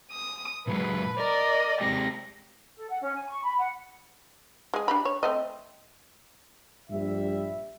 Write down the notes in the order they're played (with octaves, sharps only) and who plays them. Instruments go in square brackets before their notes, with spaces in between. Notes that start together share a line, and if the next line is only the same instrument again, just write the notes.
[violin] D#6
[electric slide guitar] A#2 F#3 G#3 [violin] B4
[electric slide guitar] A#4 [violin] D5 D#5
[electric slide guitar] G#3 C4 G4 [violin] A#6
[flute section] A4
F#5
C#4
G#5
C#6
B5
F#5
[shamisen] G#3 G#4
D4 G4 B5
C#5
A3 C4 D#5
[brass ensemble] A#1 G2 G3 E5